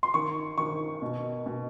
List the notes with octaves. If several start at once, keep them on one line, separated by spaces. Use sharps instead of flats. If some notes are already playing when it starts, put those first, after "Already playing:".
C6
D#3 C#6
D#3 C#6
B2
B2